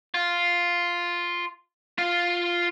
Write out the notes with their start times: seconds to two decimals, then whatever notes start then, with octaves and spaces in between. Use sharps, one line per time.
0.14 F4
1.98 F4 F5